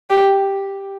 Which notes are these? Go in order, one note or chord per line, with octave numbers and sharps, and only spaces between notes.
G4